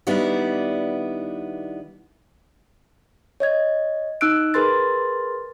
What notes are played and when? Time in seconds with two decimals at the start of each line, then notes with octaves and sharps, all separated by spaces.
0.07 D#3 G3 B3 D4 E4
3.40 C#5 D#5 G#6
4.21 D#4 E6 F#6 D7
4.54 G#4 A#4 B4 C6 A6